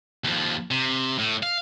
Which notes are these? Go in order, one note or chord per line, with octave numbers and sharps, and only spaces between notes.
D#2 F3
C3
A2
F5